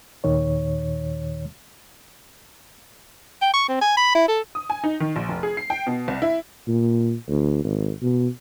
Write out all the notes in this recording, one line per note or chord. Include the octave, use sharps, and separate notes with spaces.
D#2 A#2 D#3 C#5
G5
C#6
C4
G#5
B5
E4
A4
D#6
G#5
D#4
D#3
A#1
F1
G#4
C7
G5
B2
C2
E4
A#2
D2
G#1
B2